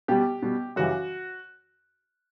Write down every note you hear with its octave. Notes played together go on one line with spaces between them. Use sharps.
B2 G3 G4
B2 G3
F#2 C#3 E3 G3 F#4